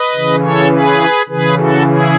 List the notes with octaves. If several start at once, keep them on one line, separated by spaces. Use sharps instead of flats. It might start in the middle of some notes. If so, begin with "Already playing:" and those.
Already playing: B4 D#5
C#3 E3
A4 C#5
G#4 B4
C#3 E3 G#4 B4
F#4 A4
E4 G#4